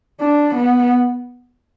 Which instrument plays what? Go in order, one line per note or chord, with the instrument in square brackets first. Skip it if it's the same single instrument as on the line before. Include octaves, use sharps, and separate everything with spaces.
[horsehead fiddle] D4
B3